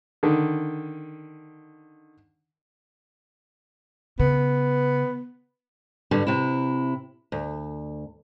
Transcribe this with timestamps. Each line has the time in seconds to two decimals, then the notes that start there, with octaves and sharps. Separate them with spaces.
0.23 D3 D#3
4.20 C#3 B3
6.11 G2 D3 G3
6.27 C3 E4
7.32 D2